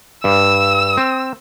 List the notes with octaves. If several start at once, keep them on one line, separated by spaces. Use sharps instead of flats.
G2 E6
C4